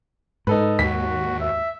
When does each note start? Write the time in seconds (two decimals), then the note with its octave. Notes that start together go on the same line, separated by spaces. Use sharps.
0.47 G#2 D#4 A4 B4
0.79 D#2 F#4 B6
1.40 E5